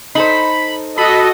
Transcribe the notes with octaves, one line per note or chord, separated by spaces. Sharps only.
D#4 A4 C5 B5
F#4 A4 D#5 B5